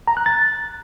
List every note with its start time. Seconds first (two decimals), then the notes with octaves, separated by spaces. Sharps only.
0.07 A#5
0.17 F#6
0.26 A6